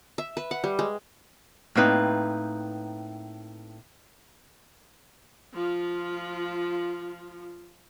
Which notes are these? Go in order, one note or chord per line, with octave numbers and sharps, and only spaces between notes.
E5
B4
F#5
G3
G#3
A2 A#3 C4 D#4 B4
F3 F4